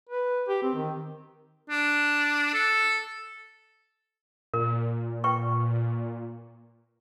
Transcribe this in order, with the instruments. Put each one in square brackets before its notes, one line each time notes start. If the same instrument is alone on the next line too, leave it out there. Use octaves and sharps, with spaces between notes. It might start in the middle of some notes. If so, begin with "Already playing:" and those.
[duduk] B4
G4
C4
D#3
[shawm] D4
A4
[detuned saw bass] A#2 [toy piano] A#4
[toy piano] B4 G5 C#6